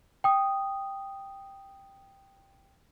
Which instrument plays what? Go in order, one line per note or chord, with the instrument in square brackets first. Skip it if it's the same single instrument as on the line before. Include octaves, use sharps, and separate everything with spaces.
[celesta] G5 D#6